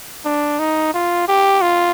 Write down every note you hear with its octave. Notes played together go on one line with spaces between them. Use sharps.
D4
D#4
F4
G4
F4